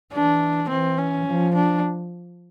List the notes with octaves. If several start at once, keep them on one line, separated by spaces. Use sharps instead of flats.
E3 D4
E3 C4
C#4
F3
D4